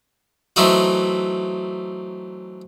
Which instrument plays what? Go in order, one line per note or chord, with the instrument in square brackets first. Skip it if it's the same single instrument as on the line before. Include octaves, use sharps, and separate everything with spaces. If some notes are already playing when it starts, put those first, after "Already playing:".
[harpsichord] E3 F#3 A3 C4 D#4 F#4